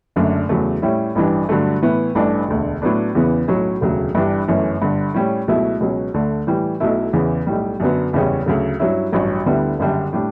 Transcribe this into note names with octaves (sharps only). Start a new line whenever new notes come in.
F#1 F#2 D3 A3 D4
E2 C#3 F#3 A3
A2 G3 C#4 E4
A1 G2 E3 G3 D4
G2 D3 F#3 A3
A2 E3 B3 E4
A1 G2 E3 A3 D4
E1 D2 D3
A2 F#3 B3 D4
E2 C#3 E3 B3
B1 A2 F#3 C#4
E1 D2 C#3 F#3
G1 G2 E3 G3 D4
G1 F#2 E3 A3 C#4
G1 G2 D3
A2 G3 C#4
C#2 B2 F#3 A3 E4
C#2 B2 F#3 C#4
D2 D3 A3
A2 E3 G3
B1 B2 F#3 A3 E4
E2 C#3 E3
B1 A2 G3
F#2 D3 F#3 B3
F#1 E2 C#3 G3 C#4
D2 C#3 F#3
G2 F#3 C#4 E4
A1 G2 F#3 C#4
D2 D3 G3 B3 E4
F#1 F#2 D3 G3 D4
A2 G3 D4